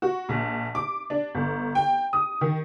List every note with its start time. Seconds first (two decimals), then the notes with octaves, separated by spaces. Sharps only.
0.02 F#4
0.29 A#1
0.75 D6
1.10 D4
1.35 G1
1.75 G5
2.13 D#6
2.41 D#3